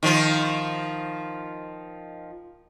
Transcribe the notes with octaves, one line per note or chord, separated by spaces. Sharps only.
D#3 F3 F4